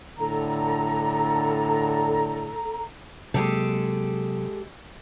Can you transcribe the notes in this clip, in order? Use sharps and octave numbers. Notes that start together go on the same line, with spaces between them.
A2 D3 A4 A#5
C3 F#3 G#3 A#3 G4 A4